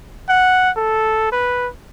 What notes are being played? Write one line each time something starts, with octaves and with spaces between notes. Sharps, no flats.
F#5
A4
B4